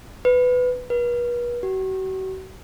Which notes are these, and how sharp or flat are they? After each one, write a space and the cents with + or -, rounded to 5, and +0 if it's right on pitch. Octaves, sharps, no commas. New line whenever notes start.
B4 +10
B4 -40
F#4 +40